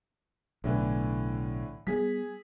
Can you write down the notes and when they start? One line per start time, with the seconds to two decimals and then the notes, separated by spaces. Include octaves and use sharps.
0.64 B1 A2 D3 E3
1.87 G3 B3 G#4 B6